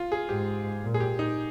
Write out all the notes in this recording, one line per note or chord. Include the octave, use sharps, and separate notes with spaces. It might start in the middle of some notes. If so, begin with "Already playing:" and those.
Already playing: F4
G#4
G#2 G4
A#2
G#4
G4
D#4